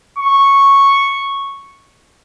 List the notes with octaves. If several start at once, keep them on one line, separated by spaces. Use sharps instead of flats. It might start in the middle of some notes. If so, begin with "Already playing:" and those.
C#6